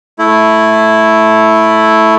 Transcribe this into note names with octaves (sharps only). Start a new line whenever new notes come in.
A3 E4